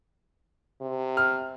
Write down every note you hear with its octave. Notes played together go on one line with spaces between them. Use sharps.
C3
F6